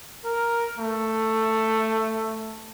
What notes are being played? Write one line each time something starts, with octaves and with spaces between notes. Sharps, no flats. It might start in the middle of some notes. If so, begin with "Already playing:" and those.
A#4
A3